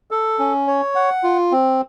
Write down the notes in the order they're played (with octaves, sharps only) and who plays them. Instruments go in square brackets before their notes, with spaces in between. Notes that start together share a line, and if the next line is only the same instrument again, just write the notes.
[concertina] A4
C#4
C#5
F#5
F4
C4